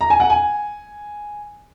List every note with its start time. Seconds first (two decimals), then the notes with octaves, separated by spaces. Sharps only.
0.01 A#5
0.10 G#5
0.20 F#5
0.30 G#5